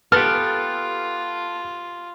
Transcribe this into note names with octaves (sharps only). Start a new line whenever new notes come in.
B3 F4 G4 A4 F6